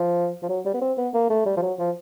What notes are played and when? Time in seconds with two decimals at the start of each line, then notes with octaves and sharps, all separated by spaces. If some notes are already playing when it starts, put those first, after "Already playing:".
Already playing: F3
0.42 F3
0.49 F#3
0.65 G3
0.74 B3
0.81 C4
0.98 B3
1.14 A#3
1.30 A3
1.46 G3
1.57 F3
1.62 F#3
1.79 F3